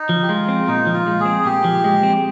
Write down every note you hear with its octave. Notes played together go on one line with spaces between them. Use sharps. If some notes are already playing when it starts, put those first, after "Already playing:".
Already playing: D#4
F3
G4
G#3 F4
C4
A#2 D#4
F3
F4
G#3
G#4
C4
A#2 G4
F3
G#3
C4